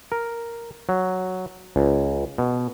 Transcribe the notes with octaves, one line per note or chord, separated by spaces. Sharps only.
A#4
F#3
C#2
B2